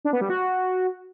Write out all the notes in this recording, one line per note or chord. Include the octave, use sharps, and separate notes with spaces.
D4
B3
G3
F#4